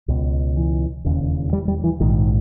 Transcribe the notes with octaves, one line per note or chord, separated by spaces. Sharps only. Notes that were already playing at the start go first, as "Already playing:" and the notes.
C#2 B2
E3
E1 D#2 C#3
G3
G3
E3
A#1 G#2 D#3